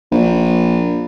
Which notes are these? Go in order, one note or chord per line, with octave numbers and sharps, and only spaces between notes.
A#1